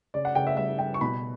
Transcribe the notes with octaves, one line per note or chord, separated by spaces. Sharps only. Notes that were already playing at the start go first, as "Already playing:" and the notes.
C#3 D5
F#5
C#3 G5
E5
G3 E5
G3 G5
C#6
B2 B5